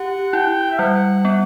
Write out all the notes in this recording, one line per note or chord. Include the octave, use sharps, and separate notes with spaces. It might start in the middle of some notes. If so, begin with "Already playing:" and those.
Already playing: G4 F#5
E4 G5
E5
G3 F#5
B3